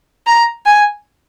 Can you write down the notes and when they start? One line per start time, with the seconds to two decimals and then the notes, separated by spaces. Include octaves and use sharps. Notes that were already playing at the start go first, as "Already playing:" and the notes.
0.27 A#5
0.66 G#5